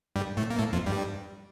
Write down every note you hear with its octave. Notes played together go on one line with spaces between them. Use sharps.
G2 G3
A2 A3
A#3
A2 A3
F2 F3
G2 G3